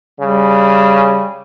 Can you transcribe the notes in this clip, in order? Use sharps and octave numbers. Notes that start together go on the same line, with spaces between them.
C#3 G3